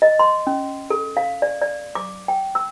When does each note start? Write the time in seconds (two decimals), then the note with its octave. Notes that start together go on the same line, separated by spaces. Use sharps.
0.02 D#5
0.19 C6
0.47 C#4
0.90 A4
1.17 F5
1.42 D5
1.61 D5
1.95 D6
2.28 G5
2.55 E6